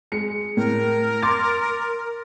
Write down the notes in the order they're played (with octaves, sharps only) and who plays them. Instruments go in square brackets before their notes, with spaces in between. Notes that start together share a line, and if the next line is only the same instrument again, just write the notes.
[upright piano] G#3 C#7
[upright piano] A2 [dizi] A#4
[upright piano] C6 D6 A6